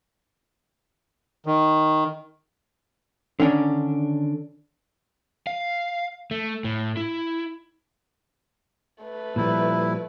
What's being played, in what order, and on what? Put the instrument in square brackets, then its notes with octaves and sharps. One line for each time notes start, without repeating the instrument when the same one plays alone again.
[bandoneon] D#3
[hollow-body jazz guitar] D3 D#3 C#4 D4
[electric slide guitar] F5
A3
A2
E4
[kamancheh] A3 B4
[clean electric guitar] A#2 F3 G3 [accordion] E4